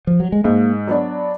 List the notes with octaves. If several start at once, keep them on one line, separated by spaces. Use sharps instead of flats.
F3
F#3
G#3
G#2 A#3
F#3 B3 D4